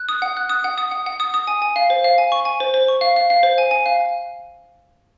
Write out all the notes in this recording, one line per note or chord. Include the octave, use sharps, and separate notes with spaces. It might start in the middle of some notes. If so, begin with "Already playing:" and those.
Already playing: F#6
D#6
F#5
F#6
D#6
F#5
D#6
F#5
F#5
D#6
D#6
G#5
G#5
F5
C5
F5
G#5
C#6
G#5
C5
C5
C#6
F5
F5
F5
C5
G#5
G#5
F5